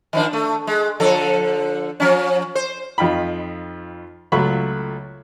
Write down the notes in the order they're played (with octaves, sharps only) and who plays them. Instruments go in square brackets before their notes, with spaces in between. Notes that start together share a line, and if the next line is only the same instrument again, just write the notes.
[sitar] D#3 F3 D4
A3
G#3
D3 F3 A4
F3 C#4
C5
[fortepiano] F2 D#4 F4 G5 B5
C#2 F#3 A3 F4 B5 C#6